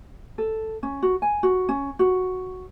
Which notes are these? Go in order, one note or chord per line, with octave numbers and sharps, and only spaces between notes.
A4
C#4
F#4
G#5
F#4
C#4
F#4